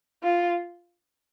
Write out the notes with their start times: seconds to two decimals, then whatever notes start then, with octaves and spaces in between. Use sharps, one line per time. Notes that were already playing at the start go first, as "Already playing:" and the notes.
0.23 F4